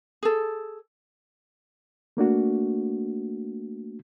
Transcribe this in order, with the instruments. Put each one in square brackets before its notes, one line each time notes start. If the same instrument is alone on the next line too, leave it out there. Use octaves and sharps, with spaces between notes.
[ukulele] G#4 A4
[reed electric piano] A3 A#3 D4 F#4